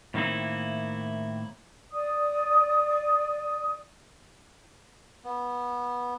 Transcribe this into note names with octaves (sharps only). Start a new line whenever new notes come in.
A2 D#3 A#3 C4 D#4 E4
D5 D#6
B3